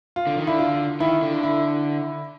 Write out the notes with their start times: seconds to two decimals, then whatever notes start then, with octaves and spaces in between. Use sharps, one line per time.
0.16 F4
0.27 D3
0.37 D#3
0.47 D3 E4
0.59 F4
1.00 D#3 E4
1.22 D3
1.43 E4